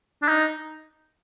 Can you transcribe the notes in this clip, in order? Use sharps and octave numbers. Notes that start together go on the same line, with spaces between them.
D4
D#4